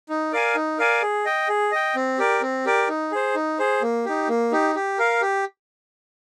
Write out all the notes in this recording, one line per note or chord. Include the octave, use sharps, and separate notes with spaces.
D#4
A#4 D5 F5 G#5
D#4
A#4 D5 F5 G#5
G#4
D#5 G5
G#4
D#5 G5
C4
G4 A#4 D5
C4
G4 A#4 D5
D#4
G#4 C5
D#4
G#4 C5
A#3
D#4 G4
A#3
D#4 G4
G4
A#4 F5
G4